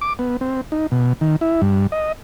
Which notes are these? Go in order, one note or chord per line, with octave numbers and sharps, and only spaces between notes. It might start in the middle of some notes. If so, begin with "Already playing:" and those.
D6
B3
C4
D#4
B2
D#3
E4
G2
D#5